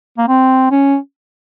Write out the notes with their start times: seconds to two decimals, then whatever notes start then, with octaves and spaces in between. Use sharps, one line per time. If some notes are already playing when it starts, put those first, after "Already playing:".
0.18 A#3
0.28 C4
0.71 C#4